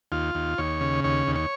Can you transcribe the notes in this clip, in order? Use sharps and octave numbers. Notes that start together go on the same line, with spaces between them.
D#2 F4
D#2
D#2 C#5
C#3
D#2 C#5
D#2
C#5